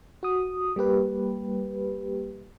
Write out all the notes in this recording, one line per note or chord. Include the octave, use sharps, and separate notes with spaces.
F#4 D#6
G3 A#3 G4 B4